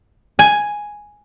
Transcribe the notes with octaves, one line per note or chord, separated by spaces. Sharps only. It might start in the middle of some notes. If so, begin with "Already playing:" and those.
G#5